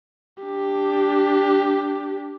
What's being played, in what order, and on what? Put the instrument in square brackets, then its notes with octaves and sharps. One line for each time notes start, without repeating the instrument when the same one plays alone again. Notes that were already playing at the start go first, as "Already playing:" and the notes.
[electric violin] D4 G4